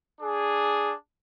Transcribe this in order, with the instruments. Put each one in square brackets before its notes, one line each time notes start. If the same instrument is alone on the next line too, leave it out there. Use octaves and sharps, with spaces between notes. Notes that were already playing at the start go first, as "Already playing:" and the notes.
[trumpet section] D4 G#4